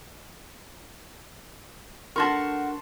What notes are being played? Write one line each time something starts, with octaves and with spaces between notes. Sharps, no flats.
A3 D4 F#4 A#4 A5 C6 C#6